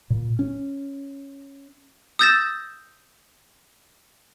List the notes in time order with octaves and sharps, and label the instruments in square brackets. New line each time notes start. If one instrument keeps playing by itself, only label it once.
[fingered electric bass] A#2
C#4
[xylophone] D#6 E6 G6 A6 A#6 E7